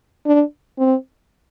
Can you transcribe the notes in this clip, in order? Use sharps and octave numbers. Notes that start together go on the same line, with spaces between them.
D4
C4